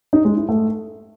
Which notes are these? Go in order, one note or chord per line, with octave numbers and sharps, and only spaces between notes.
D#4
G#3
E4
A3